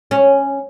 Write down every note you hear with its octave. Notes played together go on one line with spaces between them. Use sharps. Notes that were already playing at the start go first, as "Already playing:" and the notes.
C#4